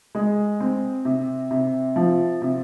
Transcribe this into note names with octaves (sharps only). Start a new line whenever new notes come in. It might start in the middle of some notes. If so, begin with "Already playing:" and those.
G#3
C4
C3
C3
F3
C3